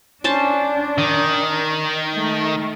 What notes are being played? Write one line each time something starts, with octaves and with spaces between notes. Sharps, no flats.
C#4 D4 C5 A5
D#3
A3